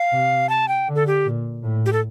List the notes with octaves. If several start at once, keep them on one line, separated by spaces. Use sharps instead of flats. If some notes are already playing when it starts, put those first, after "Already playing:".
Already playing: F5
C3
A5
G5
D3
A4
G4
A#2
A2
G4
A4